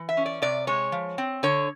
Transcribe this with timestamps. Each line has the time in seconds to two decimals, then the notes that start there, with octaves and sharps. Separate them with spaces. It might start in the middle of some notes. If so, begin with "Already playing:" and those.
Already playing: E3
0.09 E5
0.17 C#4
0.26 D5
0.42 C3 D5
0.67 G#3 C#5
0.92 F3
1.18 C4
1.43 D3 C#5